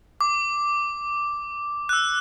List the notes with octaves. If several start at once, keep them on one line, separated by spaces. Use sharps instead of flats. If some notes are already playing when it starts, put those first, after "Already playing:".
D6
F#6
E6